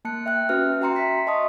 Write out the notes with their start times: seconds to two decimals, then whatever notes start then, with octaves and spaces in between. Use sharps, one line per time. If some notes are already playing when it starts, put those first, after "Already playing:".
0.05 A#3 A5 F#6 C#7
0.26 E5 G5 F#6
0.49 C#4 F#4 B4 E5 F6
0.81 F#4 E5 G5 A#5 C6 C#7
0.96 E5 B6
1.27 D#5 A5 C6 C#6 D#6